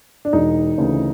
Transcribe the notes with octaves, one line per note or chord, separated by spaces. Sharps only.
D4
E1 D#4
D2 C#3 E3